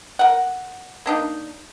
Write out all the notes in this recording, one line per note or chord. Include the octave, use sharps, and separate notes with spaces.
A#4 F#5
A#3 D4 D#4